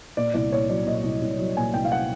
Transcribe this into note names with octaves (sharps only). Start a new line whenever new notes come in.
A#2 D5
C2 D5
A#2 C#5
F#3 D5
A#2 D#5
C2
C2
F#3
A#2 G#5
C2 G5
F5
F#5